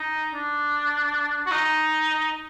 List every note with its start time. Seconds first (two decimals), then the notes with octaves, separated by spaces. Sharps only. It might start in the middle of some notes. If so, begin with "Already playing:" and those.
Already playing: D#4
0.34 D4
1.46 F#4
1.51 D#4